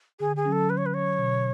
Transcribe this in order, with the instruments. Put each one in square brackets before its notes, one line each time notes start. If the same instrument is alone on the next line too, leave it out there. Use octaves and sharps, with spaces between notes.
[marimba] D3 [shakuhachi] G#4
[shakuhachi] G#4
[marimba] F#3 C#4
[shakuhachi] A4
[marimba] D3 [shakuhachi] B4
[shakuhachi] C#5
B4
[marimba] F#3 C#4 [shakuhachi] C#5
[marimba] B2